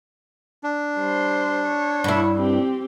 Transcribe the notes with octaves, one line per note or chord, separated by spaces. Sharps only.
D4
G3 C5
C#5
G2 E4
C4 G4